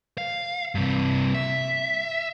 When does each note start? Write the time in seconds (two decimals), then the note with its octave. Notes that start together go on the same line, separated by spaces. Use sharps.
0.18 F5
0.75 G2 C3
1.34 E5